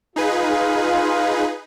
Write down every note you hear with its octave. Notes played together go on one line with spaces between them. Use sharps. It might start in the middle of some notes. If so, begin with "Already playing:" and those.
D#4 F4 G#4 B4